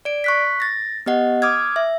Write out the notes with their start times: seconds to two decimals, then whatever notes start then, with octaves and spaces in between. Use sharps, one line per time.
0.05 D5 D7
0.24 C#6 F#6 B6
0.60 A6 A#6
1.06 B3 G4 D#5 F#5
1.42 D6 D#6 F6 G#6
1.76 E5